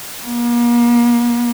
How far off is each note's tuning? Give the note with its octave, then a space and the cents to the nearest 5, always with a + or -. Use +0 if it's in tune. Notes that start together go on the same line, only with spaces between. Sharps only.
A#3 +40